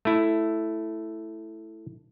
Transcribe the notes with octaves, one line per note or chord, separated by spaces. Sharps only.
A3 E4